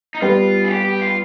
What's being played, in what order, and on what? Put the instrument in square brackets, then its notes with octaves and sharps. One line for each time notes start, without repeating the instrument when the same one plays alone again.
[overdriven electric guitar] D#4
[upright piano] G3 B3 [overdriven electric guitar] F4
[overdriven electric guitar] G#4
G4
G4
F4